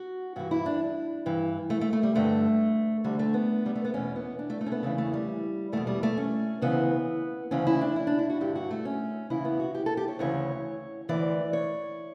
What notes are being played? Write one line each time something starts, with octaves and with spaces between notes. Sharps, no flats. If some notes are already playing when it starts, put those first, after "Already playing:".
Already playing: F#4
G2 E3 F#4
E4
D4
G2 E3
A3
A3
A3
G3
G2 D3 A3
D2 D3 G3
A3
B3
G3
A3
B3
E2 B2 C#4
B3
D4
A3
A3
C#4
B3
E2 C#3 E3 A3
A3
G3
E2 B2 A3
G3
A3
C#4
D2 C#3 E3 B3
D2 C#3 E3 C#4
E4
D4
E4
D4
E4
F#4
G2 D3 G4
F#4
A3
C#4
E2 C#3 E3 E4
B3
F#4
G4
A4
G4
C#5
D2 C#3 E3 C#5
D2 C#3 E3 D5
C#5